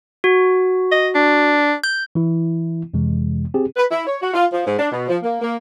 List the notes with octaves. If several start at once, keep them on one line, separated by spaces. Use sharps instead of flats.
F#4
D#5
D4
G6
E3 E4
F2 C3 E3 G#3
C4 G4 G#4
B4
E4
C#5
F#4
F4
F3
G#2
D4
B2
F3
A#3
A#3